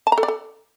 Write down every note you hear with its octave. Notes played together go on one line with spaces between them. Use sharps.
A5
A#5
A4
D5
A4